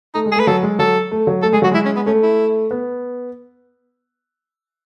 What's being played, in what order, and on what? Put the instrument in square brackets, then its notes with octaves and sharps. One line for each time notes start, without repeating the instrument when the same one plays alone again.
[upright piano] A3 [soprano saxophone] D#4
[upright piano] G#3
[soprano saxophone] G#4
[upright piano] A3 [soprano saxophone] B4
[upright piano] F#3 [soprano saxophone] A4
[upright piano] G#3
[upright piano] F#3 [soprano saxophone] A4
[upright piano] A3
F#3
[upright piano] A3 [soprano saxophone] A4
[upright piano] G#3 [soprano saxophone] G#4
[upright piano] F#3 [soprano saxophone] F#4
[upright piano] G#3 [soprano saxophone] E4
[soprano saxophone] C#4
B3
[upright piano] A3 [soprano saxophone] C#4
[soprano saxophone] E4
[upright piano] B3